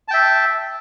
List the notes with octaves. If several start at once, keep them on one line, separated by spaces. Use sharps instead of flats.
E5 G5 A5